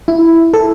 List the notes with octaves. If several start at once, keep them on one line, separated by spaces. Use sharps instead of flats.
E4
A4